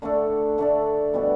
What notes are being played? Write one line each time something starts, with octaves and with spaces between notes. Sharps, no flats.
D3 A3 D4 A4
D3 A3 D4 A4
B2 G3 D4 F#4